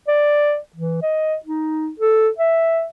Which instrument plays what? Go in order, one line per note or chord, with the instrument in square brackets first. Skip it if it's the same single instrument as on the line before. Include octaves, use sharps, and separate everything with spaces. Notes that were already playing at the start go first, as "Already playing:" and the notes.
[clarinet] D5
E3
D#5
D#4
A4
E5